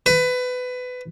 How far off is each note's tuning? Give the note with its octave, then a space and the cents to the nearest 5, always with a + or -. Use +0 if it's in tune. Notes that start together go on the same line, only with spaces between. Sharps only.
B4 +20